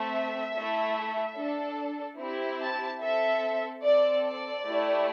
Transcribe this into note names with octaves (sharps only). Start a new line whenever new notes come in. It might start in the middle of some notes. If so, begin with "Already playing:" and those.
Already playing: A3 C4 A4 E5
A3 E4 A4
D4 A4
C4 E4 G4
A5
C4 A4 E5
C4 A4 D5
D5
A3 E4 G4